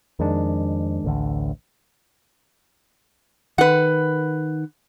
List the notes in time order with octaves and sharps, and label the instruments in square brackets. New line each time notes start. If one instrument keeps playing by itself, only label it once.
[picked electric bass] F2 [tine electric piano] D#3 G#3 D4
[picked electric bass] A1 D2 D3
[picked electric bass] D#3 [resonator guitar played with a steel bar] B4 F#5